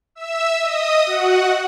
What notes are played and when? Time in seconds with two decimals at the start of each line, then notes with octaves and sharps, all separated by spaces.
0.15 E5 E6
0.61 D#5 D#6
1.06 F#4 F#5